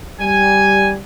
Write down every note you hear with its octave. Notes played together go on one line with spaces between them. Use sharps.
G3 G#5